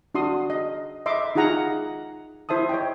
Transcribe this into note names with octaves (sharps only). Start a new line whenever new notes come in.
D4 F#4 C6 D#6
D#5
D#5 E5 C6 D6
D#4 F4 G#4 F#5 A#5
E4 C5 E5 A5 D#6
C#5 D#5 G5